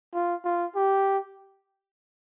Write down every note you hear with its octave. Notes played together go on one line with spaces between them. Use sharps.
F4
F4
G4